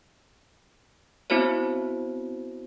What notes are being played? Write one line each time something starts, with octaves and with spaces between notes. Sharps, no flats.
B3 C4 E4 F#4 C5 C#5